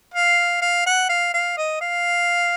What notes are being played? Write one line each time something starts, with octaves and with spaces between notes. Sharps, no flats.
F5
F5
F#5
F5
F5
D#5
F5